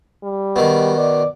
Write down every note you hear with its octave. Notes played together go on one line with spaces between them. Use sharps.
G3
B2 D#3
D5